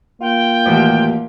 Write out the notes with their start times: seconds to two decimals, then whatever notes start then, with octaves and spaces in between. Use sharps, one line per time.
0.21 A#3 F4 G5
0.66 A1 D#2 F#4